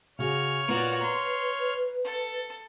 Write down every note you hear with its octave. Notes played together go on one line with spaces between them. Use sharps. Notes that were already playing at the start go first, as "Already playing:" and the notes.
C#3 F#4 G#4 C#5 F6
A#2 F#4 B4 D5 A#5 D7
A#5 C6
A4